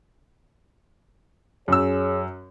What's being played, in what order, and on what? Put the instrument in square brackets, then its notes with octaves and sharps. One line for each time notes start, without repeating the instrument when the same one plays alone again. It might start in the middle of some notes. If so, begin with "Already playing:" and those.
[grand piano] F#2 E6 [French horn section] G#4 C#5